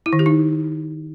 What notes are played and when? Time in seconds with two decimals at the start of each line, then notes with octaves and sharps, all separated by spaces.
0.06 E4
0.13 D#3
0.19 G4
0.26 D#4